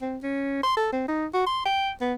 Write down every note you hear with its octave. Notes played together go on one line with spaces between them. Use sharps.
C4
C#4
C6
A4
C4
D#4
F#4
C6
G5
B3